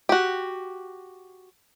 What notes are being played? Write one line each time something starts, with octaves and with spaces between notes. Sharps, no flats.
F#4 G4